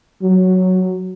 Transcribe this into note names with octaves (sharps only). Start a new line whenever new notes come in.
F#3